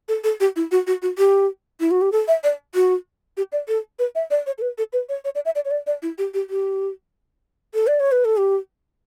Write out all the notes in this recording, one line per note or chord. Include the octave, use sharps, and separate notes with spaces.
A4
A4
G4
E4
F#4
F#4
F#4
G4
E4
F#4
G4
A4
E5
D5
F#4
G4
D5
A4
B4
E5
D5
C#5
A4
B4
A4
B4
C#5
C#5
D5
E5
D5
C#5
D5
D5
E4
G4
G4
G4
A4
D5
C#5
B4
A4
G4